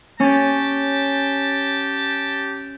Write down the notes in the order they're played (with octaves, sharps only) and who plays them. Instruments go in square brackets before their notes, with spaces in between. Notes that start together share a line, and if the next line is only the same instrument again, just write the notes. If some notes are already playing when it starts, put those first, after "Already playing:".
[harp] C#4 [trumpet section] G4 A5